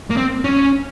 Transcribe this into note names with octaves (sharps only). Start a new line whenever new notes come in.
A#3
C4
C#4